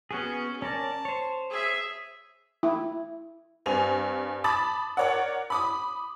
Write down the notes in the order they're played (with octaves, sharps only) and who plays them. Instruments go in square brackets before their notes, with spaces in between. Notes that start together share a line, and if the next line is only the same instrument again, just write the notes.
[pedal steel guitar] B3 F#4 G#4 [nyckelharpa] C#4
[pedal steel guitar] C#4 A#4 D5 [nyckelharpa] A5
[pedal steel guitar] C5 C#5
[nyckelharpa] G#4 E5
[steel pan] E4
[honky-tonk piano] G2 C4 G#5 F7
A5 B5 D6 D#6 A6
A#4 C#5 D5 F#5
B5 D6 D#6